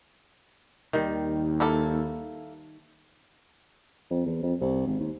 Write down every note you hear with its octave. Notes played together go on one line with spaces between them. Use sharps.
D#2 D#3 G3
A#3 E4 A4
F2
E2
F2
C2
G#1
D#2